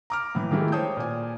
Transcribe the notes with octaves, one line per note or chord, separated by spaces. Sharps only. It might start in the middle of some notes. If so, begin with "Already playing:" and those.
A#5 D6 F6
A2 E3
D#3 E3 G#3 A3 E4 G4
C5 C#5 G5 A5 D#6 G6
A#2 G#5